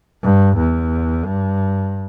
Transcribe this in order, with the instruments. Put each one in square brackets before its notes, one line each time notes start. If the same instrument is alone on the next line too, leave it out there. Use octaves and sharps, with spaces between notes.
[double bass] G2
E2
G2